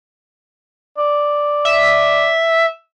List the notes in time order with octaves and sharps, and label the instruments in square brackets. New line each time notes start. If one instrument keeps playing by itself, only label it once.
[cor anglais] D5
[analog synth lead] E5